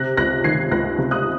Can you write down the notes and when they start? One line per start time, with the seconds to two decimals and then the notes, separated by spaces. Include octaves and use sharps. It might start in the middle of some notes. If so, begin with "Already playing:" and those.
Already playing: C3 F#6 A#6
0.17 C#2 F#6 A#6
0.44 D#3 G#6 C7
0.71 C#2 F#6 A#6
0.98 C3
1.11 D#6 F#6